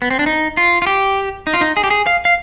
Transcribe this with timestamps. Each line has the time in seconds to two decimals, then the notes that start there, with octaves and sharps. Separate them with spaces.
0.02 B3
0.11 C4
0.19 D4
0.26 D#4
0.57 F4
0.82 F4
0.87 G4
1.47 D#4
1.54 F4
1.61 D#4
1.77 G#4
1.84 G4
1.90 G#4
2.07 F5
2.25 F5